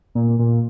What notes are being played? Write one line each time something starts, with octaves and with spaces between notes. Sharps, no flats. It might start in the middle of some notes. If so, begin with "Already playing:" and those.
A#2
A#2